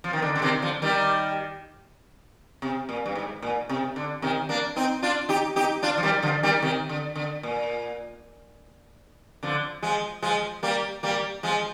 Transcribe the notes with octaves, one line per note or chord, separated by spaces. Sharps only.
F3
D#3
D3
D3
C3 D#3
D3 F3
D#3 G3
C3
A#2
G2
G#2
A#2
C3
D3
C3 D#3
A#3 D4
C4 D#4
D4 F4
D#4 G4
D#4 G4
D4 F4
F3
D#3 G3
D3 F3
D#3 G3
C3 D#3
D3
D3
A#2
D3 F3
F3 G#3
F3 G#3
G3 A#3
G3 A#3
F3 G#3